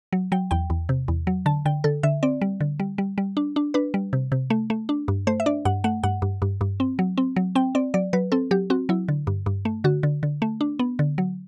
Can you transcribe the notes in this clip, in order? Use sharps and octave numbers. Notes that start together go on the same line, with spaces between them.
F#3
F#3 G5
E2 G5
E2
C3
E2
F#3
D3 A5
D3 G5
D3 A4
D3 E5
C4 D5
G3
D3
G3
G3
G3
D4
D4
D4 B4
G3
C3
C3
A3
A3
D4
G2
A3 C5
E5
D4 D5
G2 F#5
A3 F#5
G2 F#5
G2
G2
G2
C4
F#3
C4
F#3
C4 G5
C4 D5
F#3 D5
F#3 B4
C4 A4
F#3 G4
C4 F#4
F#3 E4
D3
G2
G2
A3
D3 F#4
D3
D3
A3
D4
B3
D3
F#3